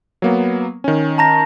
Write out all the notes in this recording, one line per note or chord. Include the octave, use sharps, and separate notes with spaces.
F#3 A#3 B3
D#3 C#4
A5 A#5 A#6